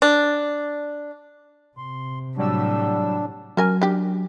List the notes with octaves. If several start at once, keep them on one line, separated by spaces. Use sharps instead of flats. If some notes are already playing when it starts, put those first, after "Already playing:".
D4
C3 C6
A2 F#3 G3 D4 E6
F#3 C#4 A#4 G#5
D4 G4